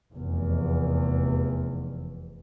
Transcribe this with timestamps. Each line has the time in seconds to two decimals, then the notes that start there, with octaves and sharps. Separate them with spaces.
0.13 F1 E2